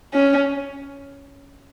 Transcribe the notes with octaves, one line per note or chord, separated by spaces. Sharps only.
C#4